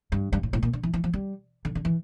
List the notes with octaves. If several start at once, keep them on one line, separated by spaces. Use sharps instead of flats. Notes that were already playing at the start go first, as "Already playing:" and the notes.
G2
G2
A2
A2
A#2
D3
E3
E3
F3
G3
D3
D3
E3